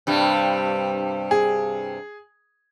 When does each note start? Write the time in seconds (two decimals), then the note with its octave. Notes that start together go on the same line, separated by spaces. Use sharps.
0.07 G2 C3 G3
1.31 G#4